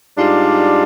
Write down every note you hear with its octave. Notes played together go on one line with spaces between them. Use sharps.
G#2 G3 D4 F4